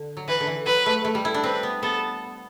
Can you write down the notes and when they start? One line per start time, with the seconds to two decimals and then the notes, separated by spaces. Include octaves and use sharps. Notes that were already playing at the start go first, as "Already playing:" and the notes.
Already playing: D3
0.17 F#3
0.28 E3 B4
0.40 D3
0.47 E3
0.66 F#3 B4
0.86 A3
1.05 A3
1.15 G3
1.25 E4
1.34 D4
1.44 C4 B4
1.63 B3
1.83 B3 A4